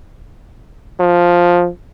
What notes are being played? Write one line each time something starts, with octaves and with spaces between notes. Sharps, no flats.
F3